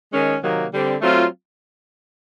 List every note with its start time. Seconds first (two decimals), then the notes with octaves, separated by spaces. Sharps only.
0.12 D#3 G#3 C#4
0.42 C3 D#3 F#3 A#3
0.73 D3 G3 C4
1.01 F#3 A3 C4 F4